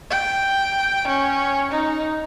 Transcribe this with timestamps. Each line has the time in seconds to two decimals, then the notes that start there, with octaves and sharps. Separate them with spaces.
0.11 G5
1.08 C#4
1.71 D#4